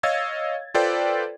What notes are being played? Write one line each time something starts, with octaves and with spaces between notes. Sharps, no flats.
C#5 D#5 F5 E6 G#6 A6
F4 A4 B4 C5 D5 G5